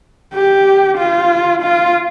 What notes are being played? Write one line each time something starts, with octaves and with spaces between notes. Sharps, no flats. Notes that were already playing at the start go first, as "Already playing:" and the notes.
G4
F4
F4